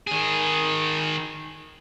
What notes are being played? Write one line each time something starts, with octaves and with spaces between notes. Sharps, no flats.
D#3 G#4